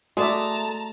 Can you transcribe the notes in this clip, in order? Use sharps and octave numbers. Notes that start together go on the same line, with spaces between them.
G#3 A3 F#4 D5 E5 A5 A#5